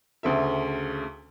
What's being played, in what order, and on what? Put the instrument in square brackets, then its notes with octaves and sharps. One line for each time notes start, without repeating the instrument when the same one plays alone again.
[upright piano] D2 C#3 A4 E5